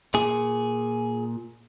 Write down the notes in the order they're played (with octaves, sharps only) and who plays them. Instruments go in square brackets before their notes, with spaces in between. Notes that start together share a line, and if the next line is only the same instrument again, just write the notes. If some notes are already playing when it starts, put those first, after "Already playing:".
[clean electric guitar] A#2 G#4